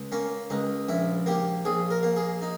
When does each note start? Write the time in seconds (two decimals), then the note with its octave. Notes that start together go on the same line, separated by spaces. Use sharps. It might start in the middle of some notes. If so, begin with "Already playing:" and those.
Already playing: C#2
0.12 A#3 C#4
0.50 C#2 D#4
0.88 A#1 E4
1.26 A#3 G4
1.65 A#1 G#4
1.90 A#4
2.03 A#3
2.16 G#4
2.42 D#4